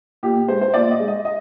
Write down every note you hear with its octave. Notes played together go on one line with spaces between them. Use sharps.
A#2 G4
G#3 C5
C5
A#2 D5
D#5
G#3
D#5
D#5